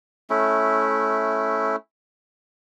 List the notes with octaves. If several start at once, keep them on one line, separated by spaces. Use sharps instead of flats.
A3 C#4 E4